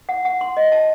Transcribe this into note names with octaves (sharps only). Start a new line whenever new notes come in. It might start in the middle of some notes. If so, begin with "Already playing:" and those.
F#5
F#5
C6
D#5
A5